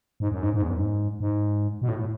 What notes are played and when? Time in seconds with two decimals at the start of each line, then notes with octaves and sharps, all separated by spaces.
0.20 G#2
0.32 F#2
0.42 G#2
0.54 G#2
0.62 E2
0.70 F#2
0.78 G#2
1.20 G#2
1.82 B2
1.88 A2
1.99 A2